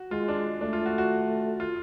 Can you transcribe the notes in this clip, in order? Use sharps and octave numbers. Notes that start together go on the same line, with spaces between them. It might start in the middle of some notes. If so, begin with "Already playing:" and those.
Already playing: F#4
G#3 F4
D4
A3 D4
F4
F#4
F#4
F4